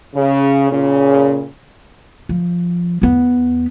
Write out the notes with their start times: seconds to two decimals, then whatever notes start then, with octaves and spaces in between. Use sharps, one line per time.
0.15 C#3
0.70 A#2 C#3
2.29 F3
3.02 E2 B3